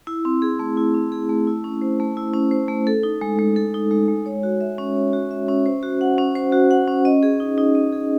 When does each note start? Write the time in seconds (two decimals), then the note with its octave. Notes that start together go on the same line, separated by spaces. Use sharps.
0.07 E4
0.25 C4
0.42 G#4
0.59 A3
0.77 E4
0.94 C4
1.12 G#4
1.29 A3
1.47 E4
1.64 C#4
1.81 C5
2.00 A3
2.17 E4
2.34 C#4
2.51 C5
2.68 A3
2.87 A4
3.03 D#4
3.21 G#3
3.39 G#3
3.56 A4
3.74 D#4
3.91 G#3
4.08 G#3
4.26 C#5
4.43 F#4
4.61 E5
4.78 C#4
4.96 C#5
5.13 F#4
5.31 E5
5.48 C#4
5.66 C5
5.83 F#4
6.01 F#5
6.18 C#4
6.35 C5
6.52 F#4
6.71 F#5
6.88 C#4
7.05 D#5
7.23 G#4
7.40 D#4
7.58 D#4
7.75 D#5
7.93 G#4